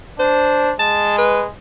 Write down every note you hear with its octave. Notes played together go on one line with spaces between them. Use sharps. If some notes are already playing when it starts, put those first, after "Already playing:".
D4 C5
G#3 A5
B4